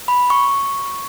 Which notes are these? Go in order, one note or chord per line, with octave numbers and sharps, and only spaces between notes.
B5
C#6